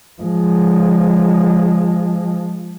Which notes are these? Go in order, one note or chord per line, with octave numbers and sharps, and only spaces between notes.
F3 G#3